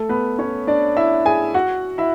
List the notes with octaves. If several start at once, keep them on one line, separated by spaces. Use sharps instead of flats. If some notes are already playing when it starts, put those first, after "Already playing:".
Already playing: A3 A4
B3 B4
C#4 C#5
D4 D5
E4 E5
G#4 G#5
F#4 F#5
E4 E5